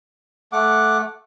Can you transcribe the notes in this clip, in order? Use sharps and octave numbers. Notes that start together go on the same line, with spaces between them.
A3 F#5 D6